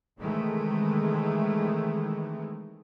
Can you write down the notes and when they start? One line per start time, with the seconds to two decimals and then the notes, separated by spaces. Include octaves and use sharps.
0.18 C3 D#3 E3 G#3 A3